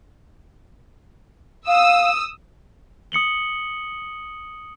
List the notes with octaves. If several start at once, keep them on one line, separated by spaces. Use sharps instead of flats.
F5 D#6 E6
D#6 C#7 F#7 G7